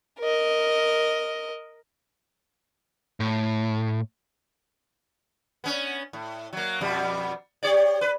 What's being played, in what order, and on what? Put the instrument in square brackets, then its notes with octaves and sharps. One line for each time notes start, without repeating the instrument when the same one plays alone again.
[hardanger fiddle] A#4 D#5
[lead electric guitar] A2
[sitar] B3 C#4
A2
F#3 A#3
F2 B2 G3
G4 C#5 D5
B4